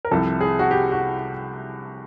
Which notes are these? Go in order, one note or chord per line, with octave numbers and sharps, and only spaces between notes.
A#4
C2 C3 F3 A4
G#4
F#4
G4
F#4